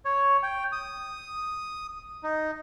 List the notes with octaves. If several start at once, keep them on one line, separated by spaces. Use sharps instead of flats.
C#5
G5
D#6
D#4